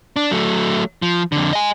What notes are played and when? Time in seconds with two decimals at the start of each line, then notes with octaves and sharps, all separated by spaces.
0.16 D4
0.31 F#3 A3
1.02 F3
1.32 F2 D3
1.53 D#5 G#5